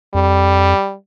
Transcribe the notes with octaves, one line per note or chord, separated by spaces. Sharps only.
F2 G3